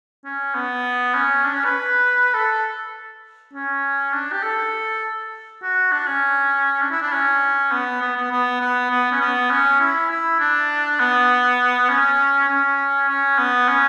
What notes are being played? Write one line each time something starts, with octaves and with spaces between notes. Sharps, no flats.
C#4
B3
C#4
D4
C#4
B4
A4
C#4
D4
G4
A4
F#4
D4
C#4
D4
E4
D4
C#4
B3
B3
B3
B3
B3
B3
C#4
B3
C#4
E4
E4
D4
B3
C#4
C#4
C#4
B3
C#4